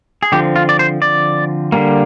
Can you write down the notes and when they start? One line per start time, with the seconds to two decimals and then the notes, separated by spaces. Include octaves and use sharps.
0.23 G#4
0.32 D3 F3 C4 G4
0.56 F4
0.69 D5
0.79 C5
1.02 D5
1.72 D3 G3 A#3